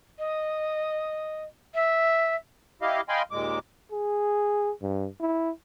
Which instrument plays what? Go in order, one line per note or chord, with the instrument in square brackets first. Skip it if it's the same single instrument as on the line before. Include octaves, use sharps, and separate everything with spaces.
[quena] D#5
E5
[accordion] E4 G4 D#5 F5
D#5 F5 G5 G#5 B5 C6
D#2 A#2 G#3 D6
[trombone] G#4
G2
E4